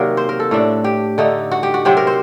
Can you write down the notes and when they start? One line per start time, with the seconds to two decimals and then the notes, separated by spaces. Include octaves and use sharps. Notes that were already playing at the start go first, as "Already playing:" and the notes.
Already playing: C3 D#3 F#3 A#3 A#4 D5
0.17 C5
0.29 A#4
0.40 A4
0.51 A2 A3 D4
0.84 G4
1.18 D3 A3 D#4
1.51 F#4
1.63 G4
1.74 F#4
1.85 C3 F#3 C4 G4
1.97 A#4
2.07 C5